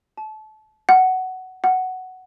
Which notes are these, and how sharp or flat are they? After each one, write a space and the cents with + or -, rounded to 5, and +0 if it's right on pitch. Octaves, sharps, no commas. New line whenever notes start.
A5 -25
F#5 +10
F#5 +5